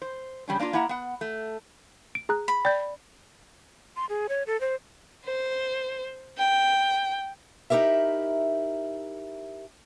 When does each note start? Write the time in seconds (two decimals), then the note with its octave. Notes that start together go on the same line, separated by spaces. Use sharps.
0.02 C5
0.48 C#3 G3 C#4 D4
0.59 A#3 D4 D#4 F4
0.73 A#3 E4 E5 F#5 A#5
0.89 B3 F#5
1.21 A3
2.15 D7
2.29 G#4 A#5 F#6
2.48 B5
2.65 D5 G5 G6
3.96 C6
4.09 G#4
4.29 C#5
4.47 A4
4.61 C5
5.26 C5
6.38 G5
7.70 D#4 E4 G4 A#4 E5